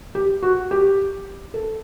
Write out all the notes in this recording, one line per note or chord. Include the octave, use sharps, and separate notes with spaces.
G4
F#4
G4
A4